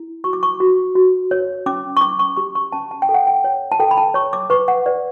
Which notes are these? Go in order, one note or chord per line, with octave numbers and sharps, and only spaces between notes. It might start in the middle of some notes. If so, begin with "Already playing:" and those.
Already playing: E4
F#4 C#6
D6
C#6
F#4
F#4
C#5
C#4 D6
C#6
C#4 D6
C#6
G4 C#6
C#6
C#4 A5
A5
G5
A4
F#5
G5
C#5
A5
A4 G5
B5
A5
C#5 C#6
D6
B4 C#6
F#5
B4 D5